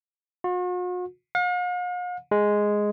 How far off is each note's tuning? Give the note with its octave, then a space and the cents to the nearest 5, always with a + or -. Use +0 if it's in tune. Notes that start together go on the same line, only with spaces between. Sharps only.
F#4 -45
F5 +45
G#3 +0